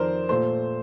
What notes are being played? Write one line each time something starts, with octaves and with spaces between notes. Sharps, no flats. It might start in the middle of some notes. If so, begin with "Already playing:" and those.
Already playing: F2 D#3 A#4 C5 D5
A#2 A3 C5